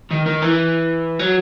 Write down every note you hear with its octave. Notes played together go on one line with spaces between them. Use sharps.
D#3
D#3
E3
F#3